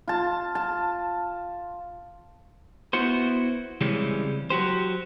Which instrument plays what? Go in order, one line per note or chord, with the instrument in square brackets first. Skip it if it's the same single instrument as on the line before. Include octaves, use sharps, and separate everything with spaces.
[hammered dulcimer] F4 A5
A5
[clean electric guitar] B3 E4 F#4 C5
C#3 E3 G3 G#3 C4 C#4
F#3 F#4 G4 C5